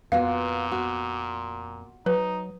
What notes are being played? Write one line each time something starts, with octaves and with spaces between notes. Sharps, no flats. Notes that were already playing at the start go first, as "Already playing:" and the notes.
F2 A#2 B3 F4 F#4 F5
F#4
F#3 D#4 B4